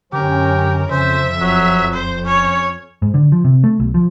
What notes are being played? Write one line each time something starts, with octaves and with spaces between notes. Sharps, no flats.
F#2 D3 C#4 G4 A#4
F2 C#3 C5 E5
D#1 F#3
C5
C#4 C#5
G#2
D3
F3
C3
A3
B1
F3